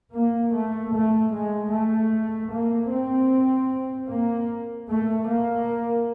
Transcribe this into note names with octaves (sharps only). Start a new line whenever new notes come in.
A#3
A3
A3
G#3
A3
A#3
C4
A#3
A3
A#3